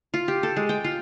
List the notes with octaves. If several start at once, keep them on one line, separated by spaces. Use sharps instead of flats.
F4
G4
A4
G#3
G5
F4